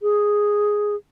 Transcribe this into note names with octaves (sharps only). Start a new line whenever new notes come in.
G#4